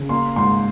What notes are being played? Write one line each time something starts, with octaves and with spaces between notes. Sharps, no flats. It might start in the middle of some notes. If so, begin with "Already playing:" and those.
Already playing: C#3
A#3 C6
G#2 C6